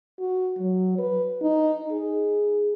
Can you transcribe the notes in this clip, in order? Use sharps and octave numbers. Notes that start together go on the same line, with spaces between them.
F#4
F#3
B4
D#4
G#4